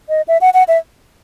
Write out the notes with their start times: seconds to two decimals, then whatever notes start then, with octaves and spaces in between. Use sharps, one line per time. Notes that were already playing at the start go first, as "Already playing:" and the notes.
0.09 D#5
0.28 E5
0.41 F#5
0.54 F#5
0.68 E5